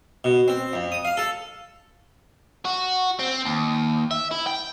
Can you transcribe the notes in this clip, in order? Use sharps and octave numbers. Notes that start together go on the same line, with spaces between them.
B2
C4
F2
D#6
F5
A4
F#4
C4
D#2
E5
E4
G5